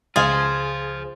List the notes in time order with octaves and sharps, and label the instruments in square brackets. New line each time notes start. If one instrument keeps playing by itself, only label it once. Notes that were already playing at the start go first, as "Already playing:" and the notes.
[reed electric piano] C#2 G#6 A6 [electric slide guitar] F4 C5 [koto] G#4 [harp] F5 C6